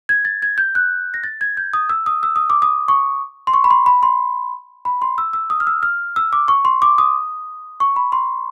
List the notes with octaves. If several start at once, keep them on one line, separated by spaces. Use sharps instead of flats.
G#6
A6
G#6
G6
F#6
A#6
A6
G#6
G6
D#6
E6
D#6
E6
D#6
D6
D#6
C#6
C6
C#6
B5
C6
B5
C6
B5
C6
E6
E6
D#6
F6
E6
F6
E6
D6
C#6
C6
D6
D#6
C#6
B5
C6